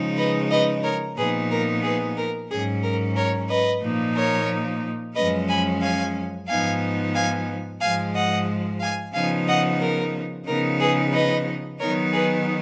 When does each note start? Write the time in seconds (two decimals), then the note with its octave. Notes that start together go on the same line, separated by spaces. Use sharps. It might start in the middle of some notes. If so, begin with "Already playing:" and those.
Already playing: C#3 F3 G#3 D#4
0.17 B4 D#5
0.51 B4 D#5
0.83 A#4 C#5
1.17 A#2 F3 B3 D#4 G#4 B4
1.51 A#4
1.83 G#4 B4
2.17 A#4
2.50 G#2 F#3 C#4 G#4
2.83 A#4
3.16 A#4 C#5
3.50 B4 D#5
3.82 A#2 F3 A#3 D#4
4.16 A#4 C#5
5.15 F#2 F3 G#3 C#4 B4 D#5
5.49 G#5 B5
5.82 F5 G#5
6.48 G#2 F3 B3 D#4 F5 G#5
7.15 F5 G#5
7.81 G#2 F3 G#3 F5 G#5
8.15 D#5 F#5
8.81 F5 G#5
9.14 C#3 F3 B3 D#4 F5 G#5
9.48 D#5 F#5
9.81 A#4
10.47 C#3 F3 B3 D#4 A#4
10.80 G#4 B4
11.13 B4 D#5
11.80 D#3 F#3 B3 D#4 A#4 C#5
12.13 G#4 B4